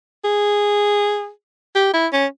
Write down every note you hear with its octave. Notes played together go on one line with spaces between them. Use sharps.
G#4
G4
E4
C#4